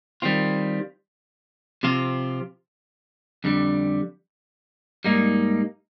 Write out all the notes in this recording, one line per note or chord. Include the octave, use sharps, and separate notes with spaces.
D#3 G3 C4 F4
C3 F3 C4 F4
F2 D3 G3
G#2 G3 A#3 D#4